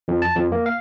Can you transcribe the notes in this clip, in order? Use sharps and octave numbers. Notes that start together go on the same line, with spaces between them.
F2
A5
F2
A#3
F5